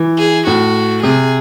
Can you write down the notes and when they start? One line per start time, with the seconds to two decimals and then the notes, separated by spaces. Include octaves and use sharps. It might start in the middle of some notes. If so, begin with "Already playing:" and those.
Already playing: E3
0.18 G#4
0.46 A2 F#4
1.03 C3 G#4